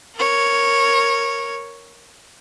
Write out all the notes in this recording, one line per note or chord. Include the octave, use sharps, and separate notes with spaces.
A#4 C#5